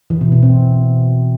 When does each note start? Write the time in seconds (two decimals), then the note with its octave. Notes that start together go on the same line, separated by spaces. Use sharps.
0.10 E3
0.21 B2
0.32 B2
0.43 C4